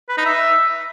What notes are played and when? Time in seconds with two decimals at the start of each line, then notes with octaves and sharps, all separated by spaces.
0.09 B4
0.17 D#4
0.26 E5